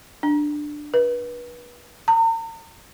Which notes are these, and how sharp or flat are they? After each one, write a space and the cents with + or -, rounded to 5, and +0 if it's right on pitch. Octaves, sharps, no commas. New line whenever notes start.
D4 +10
B4 -30
A#5 -40